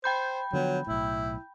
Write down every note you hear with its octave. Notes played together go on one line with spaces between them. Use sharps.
C5 G5 B5 G6
D3 F3 F#3 B3
B1 A2 E4